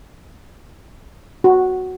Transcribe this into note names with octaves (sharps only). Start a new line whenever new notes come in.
F#4